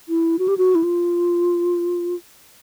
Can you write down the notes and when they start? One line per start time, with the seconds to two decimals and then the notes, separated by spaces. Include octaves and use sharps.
0.09 E4
0.39 F#4
0.48 G4
0.57 F#4
0.75 E4
0.83 F4